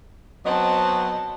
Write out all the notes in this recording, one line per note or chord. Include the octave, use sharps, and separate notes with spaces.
F#3 B3 C4 D#5 A5